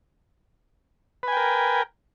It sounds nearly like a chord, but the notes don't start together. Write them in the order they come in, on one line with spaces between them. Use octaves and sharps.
B4 G#5 G5 A#4